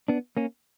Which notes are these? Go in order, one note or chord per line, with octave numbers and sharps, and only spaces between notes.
B3 D4
A#3 C#4